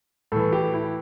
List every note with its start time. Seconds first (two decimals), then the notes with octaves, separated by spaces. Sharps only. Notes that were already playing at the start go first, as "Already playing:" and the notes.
0.32 A2 E3 A4
0.53 G4
0.74 E4